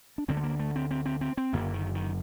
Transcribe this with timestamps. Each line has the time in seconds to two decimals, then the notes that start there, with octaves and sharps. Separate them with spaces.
0.18 D4
0.28 D2 D3 C4
0.37 A3
0.43 A#3
0.59 A3
0.76 C4
0.91 C4
1.06 C4
1.21 C4
1.37 C4
1.53 F#1 F#2 D3 A#3
1.73 D#3
1.95 D#3